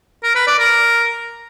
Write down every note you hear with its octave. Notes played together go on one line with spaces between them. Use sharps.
A#4
B4
D5
A#4